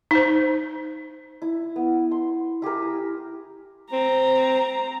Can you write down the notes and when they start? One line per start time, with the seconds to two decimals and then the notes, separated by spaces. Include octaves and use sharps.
0.11 D#4 C5
1.42 E4
1.76 B3
2.11 C6
2.62 E4 G4 G#4 A#4
3.93 C4 A#5